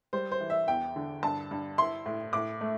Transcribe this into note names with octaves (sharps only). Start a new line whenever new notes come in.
G3 C5
C5
E3
E5
E2 G5
D3
G2 A5
G2
E4 C6
A2
A2 D6
A3